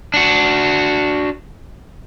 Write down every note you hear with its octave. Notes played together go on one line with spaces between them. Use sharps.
D4 F#4